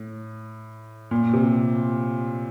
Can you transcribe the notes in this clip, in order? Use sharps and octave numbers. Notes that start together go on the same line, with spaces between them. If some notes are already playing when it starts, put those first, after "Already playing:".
Already playing: A2
A#2
C3